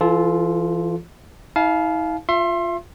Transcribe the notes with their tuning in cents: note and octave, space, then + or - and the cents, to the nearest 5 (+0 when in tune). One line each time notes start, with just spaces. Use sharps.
E3 +30 F4 +0 A4 -20
E4 -45 F5 +0 A5 -40
F4 +0 E5 +35 C6 +25